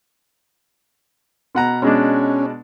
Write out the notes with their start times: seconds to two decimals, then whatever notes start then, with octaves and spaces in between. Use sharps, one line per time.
1.55 B2 F#5 A#5
1.82 B2 G#3 C#4 D4